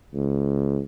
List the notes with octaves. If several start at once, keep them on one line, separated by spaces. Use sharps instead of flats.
C#2